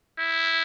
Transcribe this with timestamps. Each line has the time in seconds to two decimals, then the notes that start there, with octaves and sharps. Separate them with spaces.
0.19 E4